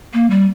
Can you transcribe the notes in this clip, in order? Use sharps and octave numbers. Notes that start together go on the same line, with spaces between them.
A#3
G3